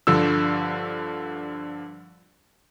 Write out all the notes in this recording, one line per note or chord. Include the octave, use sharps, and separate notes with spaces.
G2 D3 F3 E6